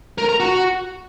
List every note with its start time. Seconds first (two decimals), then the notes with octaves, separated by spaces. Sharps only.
0.18 A#4
0.29 A#5
0.40 F#4